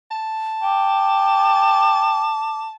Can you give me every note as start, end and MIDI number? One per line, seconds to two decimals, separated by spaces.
0.11 2.74 81
0.63 2.33 79
0.63 2.60 86